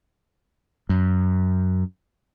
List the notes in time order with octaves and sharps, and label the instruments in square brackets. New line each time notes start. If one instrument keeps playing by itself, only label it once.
[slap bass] F#2